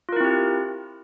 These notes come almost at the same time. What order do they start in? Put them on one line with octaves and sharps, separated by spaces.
F4 A#4 E4 C4 G4